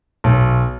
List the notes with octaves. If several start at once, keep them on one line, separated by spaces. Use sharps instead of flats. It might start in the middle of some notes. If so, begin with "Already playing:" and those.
B1